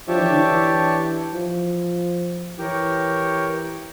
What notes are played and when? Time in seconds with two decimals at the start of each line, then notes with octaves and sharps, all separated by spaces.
0.07 F3 D4 G4 C#5 E5 A5
0.17 E3
0.27 D3
0.36 E3
1.33 F3
2.58 E3 G4 A#4 C#5